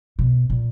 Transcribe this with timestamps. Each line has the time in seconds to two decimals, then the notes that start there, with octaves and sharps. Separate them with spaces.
0.19 B2
0.50 A#2